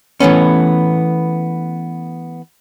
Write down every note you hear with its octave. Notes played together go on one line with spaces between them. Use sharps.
E3 A3 B3 C#4